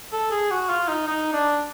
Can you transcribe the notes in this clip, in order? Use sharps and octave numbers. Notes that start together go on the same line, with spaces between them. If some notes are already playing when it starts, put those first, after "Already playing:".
A4
G#4
F#4
F4
D#4
D#4
D4